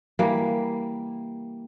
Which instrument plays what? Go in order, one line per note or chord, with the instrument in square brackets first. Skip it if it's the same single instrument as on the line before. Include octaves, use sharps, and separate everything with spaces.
[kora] E3 G3 A#3